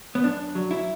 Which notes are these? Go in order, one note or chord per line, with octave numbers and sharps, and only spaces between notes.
B3
F#2 D4
F#3
E4